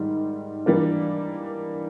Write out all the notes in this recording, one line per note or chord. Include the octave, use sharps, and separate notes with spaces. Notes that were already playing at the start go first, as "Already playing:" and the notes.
Already playing: G#2 D#3 G3
E3 G3 A#3 D4